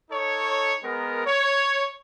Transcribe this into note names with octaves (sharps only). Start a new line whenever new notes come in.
D#4 A4 C#5
G#3 B3 A#4
C#5